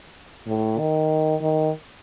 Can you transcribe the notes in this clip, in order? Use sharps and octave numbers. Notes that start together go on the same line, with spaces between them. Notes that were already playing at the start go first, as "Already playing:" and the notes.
A2
D#3
D#3